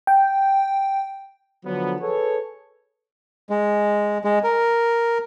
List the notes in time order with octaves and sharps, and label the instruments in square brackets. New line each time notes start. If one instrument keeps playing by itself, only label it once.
[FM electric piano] G5
[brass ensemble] D3 F3 F#3 B3
G#4 A4 B4 C#5
[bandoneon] G#3
G#3
A#4